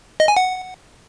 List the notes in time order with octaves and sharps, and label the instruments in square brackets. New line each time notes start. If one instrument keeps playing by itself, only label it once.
[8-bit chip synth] D#5
G#5
F#5